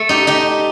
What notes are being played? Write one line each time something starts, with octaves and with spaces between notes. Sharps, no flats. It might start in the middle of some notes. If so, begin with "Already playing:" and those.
Already playing: A3
D#4 G4
D#4 G4